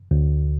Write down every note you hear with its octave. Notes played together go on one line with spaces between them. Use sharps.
D2